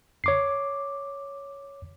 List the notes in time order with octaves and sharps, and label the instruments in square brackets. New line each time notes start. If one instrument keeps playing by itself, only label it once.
[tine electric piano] C#5 D6 C7